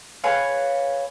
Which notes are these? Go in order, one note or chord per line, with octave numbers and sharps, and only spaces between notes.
G#4 B4 C#5 F5